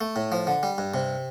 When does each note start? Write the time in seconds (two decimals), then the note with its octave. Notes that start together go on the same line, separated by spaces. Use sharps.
0.01 A3
0.16 A2
0.32 F3
0.47 D3
0.63 G3
0.78 G2
0.94 C3